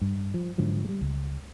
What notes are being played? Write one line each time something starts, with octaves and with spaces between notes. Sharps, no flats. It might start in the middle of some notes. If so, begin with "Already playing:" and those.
G2
F3
G#2 D3 F3 F#3
G3 G#3
C#2